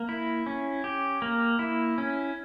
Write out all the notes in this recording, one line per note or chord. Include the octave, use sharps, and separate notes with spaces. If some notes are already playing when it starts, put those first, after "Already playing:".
Already playing: A#3
E4
C#4
G4
A#3
E4
C#4